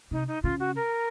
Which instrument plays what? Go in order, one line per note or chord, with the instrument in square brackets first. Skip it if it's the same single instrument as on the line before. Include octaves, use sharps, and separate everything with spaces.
[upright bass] C3 [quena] D#4
[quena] D#4
[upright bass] C#3 [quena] F4
[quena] F#4
A#4